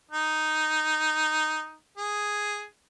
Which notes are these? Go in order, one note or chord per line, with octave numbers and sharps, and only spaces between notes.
D#4
G#4